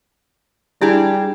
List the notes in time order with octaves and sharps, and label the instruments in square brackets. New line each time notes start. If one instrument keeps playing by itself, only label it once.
[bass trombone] G3 [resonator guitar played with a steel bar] D4 G4 G#4 [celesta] E4